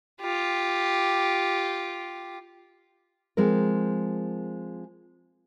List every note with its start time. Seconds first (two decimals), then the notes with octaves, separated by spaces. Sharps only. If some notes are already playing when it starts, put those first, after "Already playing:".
0.21 F4 G4
3.37 F3 G#3 C4 A#4